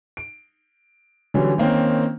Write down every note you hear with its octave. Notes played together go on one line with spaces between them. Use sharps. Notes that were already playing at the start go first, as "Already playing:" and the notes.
D7
D3 E3 F#3 G3 C#4
D#3 A#3 C4 C#4